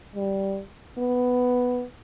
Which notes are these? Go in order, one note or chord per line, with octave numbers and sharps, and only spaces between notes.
G3
B3